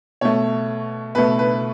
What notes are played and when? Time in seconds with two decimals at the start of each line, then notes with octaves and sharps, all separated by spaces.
0.21 B2 A3 C#5
1.15 B2 A3 B4
1.39 B4